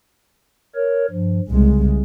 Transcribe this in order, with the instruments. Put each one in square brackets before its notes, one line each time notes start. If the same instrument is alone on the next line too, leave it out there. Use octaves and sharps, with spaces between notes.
[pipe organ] A#4 C#5
G2 F3
[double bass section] C2 G#3 [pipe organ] C#3